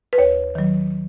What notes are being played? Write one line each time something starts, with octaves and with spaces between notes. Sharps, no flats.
B4
D#2 C#5
D#3 F#3